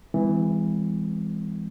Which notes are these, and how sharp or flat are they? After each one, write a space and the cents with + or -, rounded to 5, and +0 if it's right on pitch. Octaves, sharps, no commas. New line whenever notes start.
E3 +0 G#3 -35 C4 -45